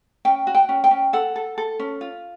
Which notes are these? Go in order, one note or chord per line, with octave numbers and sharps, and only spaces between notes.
C#4 G5
F#4
G5
C#4
G5
C#4
A4 F#5
A4
A4
C#4
F4